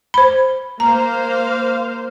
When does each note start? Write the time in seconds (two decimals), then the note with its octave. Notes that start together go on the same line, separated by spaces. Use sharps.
0.14 C5 B5
0.80 A#3 C5 F5 A#5